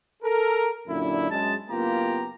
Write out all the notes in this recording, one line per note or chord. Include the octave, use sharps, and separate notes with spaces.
A4 A#4
F#2 A#2 D3 D4 E4
F#2 G#3 A5
F#1 A#3 B3 F4 G4 A#5